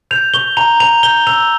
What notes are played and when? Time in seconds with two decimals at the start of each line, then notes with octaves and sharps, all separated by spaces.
0.11 G6 F7
0.34 C#6 G7
0.57 A#5 F7
0.80 A#5 F7
1.03 G6 G7
1.27 E6 F7